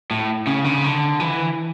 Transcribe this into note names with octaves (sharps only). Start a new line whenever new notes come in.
A2
C#3
D3
C#3
D3
E3